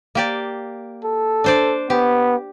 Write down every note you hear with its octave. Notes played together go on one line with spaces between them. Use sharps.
A#3 G4 D5
A4
D4 C5 D5
B3 G4